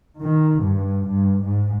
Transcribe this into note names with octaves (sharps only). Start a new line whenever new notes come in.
D#3
G2
G2
G#2